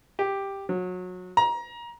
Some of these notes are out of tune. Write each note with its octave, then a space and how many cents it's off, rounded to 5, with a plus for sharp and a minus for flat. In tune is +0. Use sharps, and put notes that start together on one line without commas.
G4 +5
F#3 -25
A#5 +25